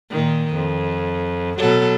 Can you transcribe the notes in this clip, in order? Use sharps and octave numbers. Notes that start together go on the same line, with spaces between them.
A#2 D#3
F2
B2 F#3 A4